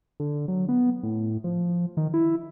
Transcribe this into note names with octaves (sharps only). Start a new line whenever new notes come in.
D3
F#3
B3
A2
F3
D#3
E4